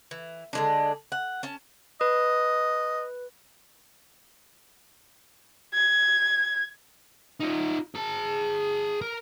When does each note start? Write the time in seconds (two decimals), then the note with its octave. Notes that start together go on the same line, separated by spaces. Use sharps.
0.11 E3
0.53 D3 G#3 D4
1.12 F#5
1.43 C#4 A5
2.01 B4 D#5
5.73 G#6
7.40 D#4 F4
7.95 G#4 A5
9.01 A#4